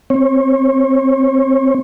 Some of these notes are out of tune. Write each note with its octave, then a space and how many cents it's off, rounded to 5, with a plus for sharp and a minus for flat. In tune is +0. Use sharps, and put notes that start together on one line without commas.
C4 +10 C#5 -30